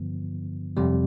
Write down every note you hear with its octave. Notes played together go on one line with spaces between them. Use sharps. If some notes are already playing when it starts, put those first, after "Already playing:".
Already playing: G2 D3 F3 B3
F2 C3 G3